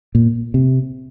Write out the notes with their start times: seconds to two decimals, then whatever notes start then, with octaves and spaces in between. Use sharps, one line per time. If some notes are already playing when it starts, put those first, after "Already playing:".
0.15 A#2
0.54 C3